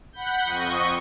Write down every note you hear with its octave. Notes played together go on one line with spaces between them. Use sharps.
F#5 B5 G6
F2 D#5 C#6